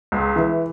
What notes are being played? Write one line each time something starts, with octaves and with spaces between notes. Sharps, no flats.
C#2
E3